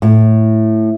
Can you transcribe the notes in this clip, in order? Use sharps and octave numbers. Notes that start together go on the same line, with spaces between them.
A2